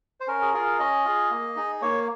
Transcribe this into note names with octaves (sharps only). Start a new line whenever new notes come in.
C5
C#4 A#4
G#4
F4 G#4 A#4
C#4 D#5
F4 G#4
A#3
D#4 G#4
A#3 C#5